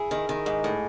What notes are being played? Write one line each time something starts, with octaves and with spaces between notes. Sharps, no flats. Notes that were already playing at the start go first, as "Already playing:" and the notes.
Already playing: E4 G#4
D#3
D#3
G#2
A2